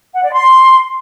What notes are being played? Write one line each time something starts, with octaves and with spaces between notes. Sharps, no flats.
F#5
D5
C6